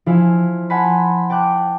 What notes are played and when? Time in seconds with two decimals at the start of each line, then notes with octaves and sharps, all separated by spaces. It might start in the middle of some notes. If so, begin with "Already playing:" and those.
0.06 F3 E4 F5 G#5 E6
0.70 F#5 G#5 A5 B5 C6
1.30 G5 A5 D6 F#6 G6